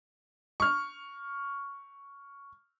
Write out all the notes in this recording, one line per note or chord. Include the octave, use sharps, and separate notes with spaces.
C#6 F6